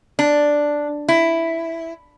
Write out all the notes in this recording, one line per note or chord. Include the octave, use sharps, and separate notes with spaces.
D4
E4